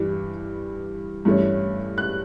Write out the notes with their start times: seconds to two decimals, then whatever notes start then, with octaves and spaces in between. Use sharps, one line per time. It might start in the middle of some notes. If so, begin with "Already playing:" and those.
Already playing: G2 E3 G3
1.25 G2 E3 A3 C#4
1.98 F#6